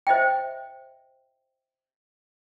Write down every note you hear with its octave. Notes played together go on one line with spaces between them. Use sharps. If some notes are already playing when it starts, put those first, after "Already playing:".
C5 D#5 E5 G5